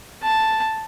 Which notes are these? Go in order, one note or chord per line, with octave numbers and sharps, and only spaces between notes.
A5